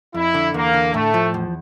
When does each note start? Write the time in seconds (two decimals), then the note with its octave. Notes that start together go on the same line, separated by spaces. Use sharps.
0.14 F2 E4
0.34 D3
0.54 E2 A#3
0.74 D3
0.94 A2 A3
1.14 F3
1.34 E2